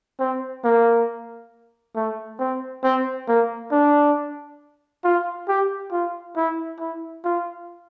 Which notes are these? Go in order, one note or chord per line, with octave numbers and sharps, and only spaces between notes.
C4
A#3
A3
C4
C4
A#3
D4
F4
G4
F4
E4
E4
F4